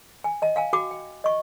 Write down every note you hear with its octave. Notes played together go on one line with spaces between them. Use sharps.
G#5
D#5 A5
F5 G#5 A5
F#4 G5 A5 D6
G5
D#5 C#6